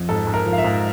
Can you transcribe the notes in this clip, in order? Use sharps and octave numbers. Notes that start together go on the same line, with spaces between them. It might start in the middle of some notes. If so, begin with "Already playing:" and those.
Already playing: F2
G#2 A4
G#2
A#4
F3
F5
E5
G#2